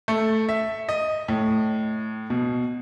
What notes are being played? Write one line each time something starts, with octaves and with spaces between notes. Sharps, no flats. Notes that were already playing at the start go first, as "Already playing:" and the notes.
A3
E5
D#5
A2
B2